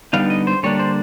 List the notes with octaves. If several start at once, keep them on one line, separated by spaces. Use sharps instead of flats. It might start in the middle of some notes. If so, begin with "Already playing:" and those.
D3 G3 B3 D#4 F5
D#5
C5
D3 G3 A#3 D4 C#5
C5